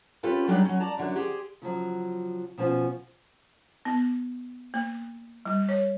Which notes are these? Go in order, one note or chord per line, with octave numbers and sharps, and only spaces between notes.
C4 C#4 F4 G4 A4 B4
F#3 G3 D4 D#4 G4 G#4
F#3 C#4
D5 A5 A#5
F#2 D3 F#3
G4 G#4 C5
C#3 F3 F#3
B2 F3 C#4 B4 C5
B3
A#3
G3
C#5